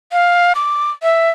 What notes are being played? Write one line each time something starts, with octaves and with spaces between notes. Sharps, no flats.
F5
D6
E5